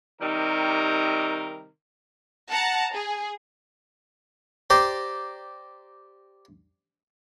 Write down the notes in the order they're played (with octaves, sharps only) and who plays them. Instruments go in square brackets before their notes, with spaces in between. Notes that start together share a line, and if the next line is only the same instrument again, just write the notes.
[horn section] C3 D#3 G3 D#4 A#4
[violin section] F#5 A5 A#5
G#4
[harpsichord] G4 C5 D5 A#5